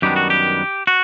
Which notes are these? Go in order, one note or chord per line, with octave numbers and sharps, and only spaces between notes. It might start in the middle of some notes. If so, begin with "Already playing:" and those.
F#2 D#3 G3 B3 D4 G4
F#4
G4
F#4